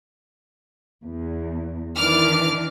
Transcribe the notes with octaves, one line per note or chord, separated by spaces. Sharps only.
E2
D#3 E3 D4 D6 F6